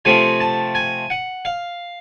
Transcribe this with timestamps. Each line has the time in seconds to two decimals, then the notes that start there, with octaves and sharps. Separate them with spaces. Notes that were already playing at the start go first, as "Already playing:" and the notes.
0.05 C3 F3 A3 C4 G#5
0.40 A5
0.75 G#5
1.10 F#5
1.45 F5